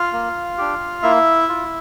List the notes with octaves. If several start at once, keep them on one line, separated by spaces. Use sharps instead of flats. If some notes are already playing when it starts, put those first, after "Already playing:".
Already playing: F4 F5
A#3
D4 G4
A#3 E4 E5
F4